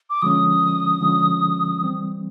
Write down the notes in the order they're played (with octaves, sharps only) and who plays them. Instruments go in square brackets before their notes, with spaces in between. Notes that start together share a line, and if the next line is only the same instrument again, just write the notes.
[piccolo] D6
[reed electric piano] D3 F3 G#3 C#4 [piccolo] D#6
[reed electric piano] D3 F3 G#3 C#4
E3 G3 C4